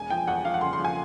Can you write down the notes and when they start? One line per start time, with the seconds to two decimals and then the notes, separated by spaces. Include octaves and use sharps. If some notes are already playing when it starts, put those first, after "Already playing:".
Already playing: E1 G#5
0.10 F3 G5
0.27 E2 F#5
0.45 F3 F5
0.54 F#5
0.61 C#3 C6
0.73 C6
0.79 F3
0.85 G#5